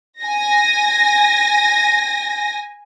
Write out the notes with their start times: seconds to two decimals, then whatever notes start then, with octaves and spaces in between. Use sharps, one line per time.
0.21 G#5 A#6